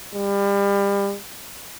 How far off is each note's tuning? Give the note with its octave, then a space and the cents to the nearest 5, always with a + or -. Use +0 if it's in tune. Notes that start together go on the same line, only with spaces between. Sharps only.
G3 +30